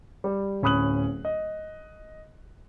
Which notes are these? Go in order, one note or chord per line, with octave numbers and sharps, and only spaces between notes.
G3
D1 C#4 B5 D#6 F#6 F#7
D#5